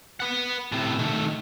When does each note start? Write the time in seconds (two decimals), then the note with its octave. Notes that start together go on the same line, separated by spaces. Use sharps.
0.20 B4 F#5
0.72 A2 C3
0.99 D#3 A3